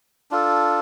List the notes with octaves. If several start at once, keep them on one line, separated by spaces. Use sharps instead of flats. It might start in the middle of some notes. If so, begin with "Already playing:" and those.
D4 F4 A4